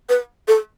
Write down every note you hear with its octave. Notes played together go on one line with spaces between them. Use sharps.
B4
A4